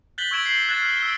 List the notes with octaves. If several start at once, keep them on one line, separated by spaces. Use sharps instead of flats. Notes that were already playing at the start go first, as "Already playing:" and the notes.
F#6 G6 A6 B6 F#7 G7
C#6 E6 G#6 D7 E7 F#7
C7
F#6 G#6 A6 E7 F#7
F6
E6 D7